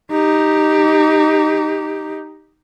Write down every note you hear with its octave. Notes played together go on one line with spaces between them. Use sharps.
D#4 G4